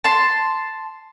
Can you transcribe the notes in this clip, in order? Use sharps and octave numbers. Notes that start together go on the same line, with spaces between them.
A5 C6